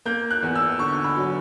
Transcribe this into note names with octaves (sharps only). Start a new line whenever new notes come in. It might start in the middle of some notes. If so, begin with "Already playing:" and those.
A#3 G6
F#6
E2
E6
D3 C#6
B5
F#3